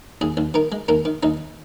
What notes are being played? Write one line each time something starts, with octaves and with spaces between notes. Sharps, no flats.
D#2 G#4
D#2
D#3 A#4
G#3
D#2 A#4
D#3
D#2 D#4